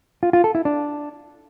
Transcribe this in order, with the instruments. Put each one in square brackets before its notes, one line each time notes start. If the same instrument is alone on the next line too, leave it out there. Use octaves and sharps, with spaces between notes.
[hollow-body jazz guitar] F4
F4
A4
E4
D4